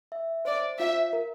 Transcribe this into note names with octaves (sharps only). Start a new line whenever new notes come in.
E5
C5 D5
F4 E5
A#4